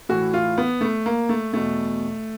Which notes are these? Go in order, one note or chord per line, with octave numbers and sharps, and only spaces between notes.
A2 E3 F#4
F4
B3
A3
A#3
A3
E2 B2 A3